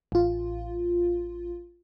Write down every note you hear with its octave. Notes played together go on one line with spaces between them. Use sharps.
A1 F4